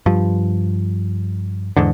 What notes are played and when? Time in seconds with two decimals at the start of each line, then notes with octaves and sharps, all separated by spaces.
0.06 G2 F3
1.77 E2 G#2 D3